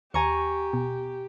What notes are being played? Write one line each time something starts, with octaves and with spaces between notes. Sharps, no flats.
D#2 G4 G#5 A#5 C#6
B2